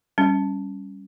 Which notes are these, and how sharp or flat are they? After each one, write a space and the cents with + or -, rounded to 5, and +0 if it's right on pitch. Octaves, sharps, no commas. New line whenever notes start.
G3 +0 C#4 +0